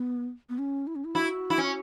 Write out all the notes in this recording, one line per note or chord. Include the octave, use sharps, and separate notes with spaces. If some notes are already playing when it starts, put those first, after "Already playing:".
Already playing: B3
B3
C#4
E4
C#4
E4
E4 F#4
E4
C#4